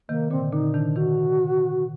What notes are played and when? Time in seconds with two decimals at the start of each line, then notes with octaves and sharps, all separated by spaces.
0.09 C3 D#3 A#3
0.31 A#2 D3 C4
0.52 A#2 D3 D#4
0.74 C3 D#3 D4
0.96 C3 D#3 F#4